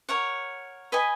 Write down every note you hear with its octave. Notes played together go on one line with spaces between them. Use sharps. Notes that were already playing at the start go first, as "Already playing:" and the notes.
A#4 C#5 F#5
B4 D#5 G#5 B5